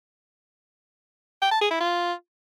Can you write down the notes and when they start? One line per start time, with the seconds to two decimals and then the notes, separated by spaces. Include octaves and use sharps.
1.42 G5
1.51 A5
1.61 G#4
1.71 E4
1.80 F4